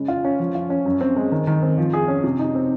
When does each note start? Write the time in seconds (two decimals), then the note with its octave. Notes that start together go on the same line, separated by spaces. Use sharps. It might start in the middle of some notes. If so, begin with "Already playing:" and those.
Already playing: C#3 G#3
0.08 F4
0.25 C#4
0.39 F3
0.55 F4
0.70 C#4
0.86 F#2
1.01 C4
1.16 G#3
1.32 D#3
1.47 D#3
1.62 C4
1.78 F3
1.93 G#4
2.08 C#4
2.24 C3
2.39 D#4
2.55 C4